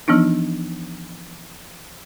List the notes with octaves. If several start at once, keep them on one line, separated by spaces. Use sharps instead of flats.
E3 F3 B3 D4 D#4